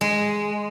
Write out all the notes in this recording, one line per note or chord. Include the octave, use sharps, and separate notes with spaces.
G#3